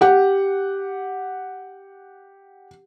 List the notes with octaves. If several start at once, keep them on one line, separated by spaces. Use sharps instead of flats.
G4 F#5